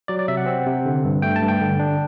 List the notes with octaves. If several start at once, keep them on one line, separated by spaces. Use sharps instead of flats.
F#3 D5
D5
C3 E5
F#5
C4
C3
D3
G2
A3 G5
A5
G2
G5
D3
D4